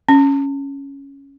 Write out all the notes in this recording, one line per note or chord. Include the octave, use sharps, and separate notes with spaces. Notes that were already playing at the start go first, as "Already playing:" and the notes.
C#4